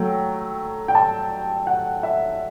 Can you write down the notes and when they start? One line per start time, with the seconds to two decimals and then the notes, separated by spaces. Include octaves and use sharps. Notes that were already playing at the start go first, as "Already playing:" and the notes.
Already playing: F#3 A3 G5
0.88 G5
0.95 A5
1.67 F#5
2.03 E5